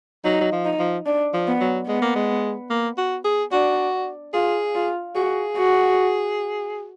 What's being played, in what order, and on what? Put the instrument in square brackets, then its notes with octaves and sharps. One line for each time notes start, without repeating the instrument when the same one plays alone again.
[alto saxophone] F#3 [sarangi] D#4
[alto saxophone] F#3
F3
[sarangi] D#4
[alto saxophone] F3
[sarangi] D4
[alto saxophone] F3
[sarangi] B3
[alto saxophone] F#3
[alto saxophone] G#3 [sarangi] B3
[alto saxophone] A#3
G#3
A#3
F#4
G#4
[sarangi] D4 [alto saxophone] F#4
[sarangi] F4 [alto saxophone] G#4
[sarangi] F4
[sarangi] F#4 [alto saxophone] G#4
[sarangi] F#4